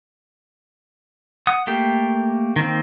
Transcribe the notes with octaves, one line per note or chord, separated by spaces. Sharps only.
F#5 D#6
A3 A#3 G4
D#3 A#3 C4